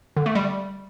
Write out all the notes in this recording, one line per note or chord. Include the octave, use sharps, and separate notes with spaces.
D3
A3
G3